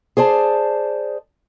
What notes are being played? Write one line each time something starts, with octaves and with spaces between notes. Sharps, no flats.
G#4 C5 D5 A5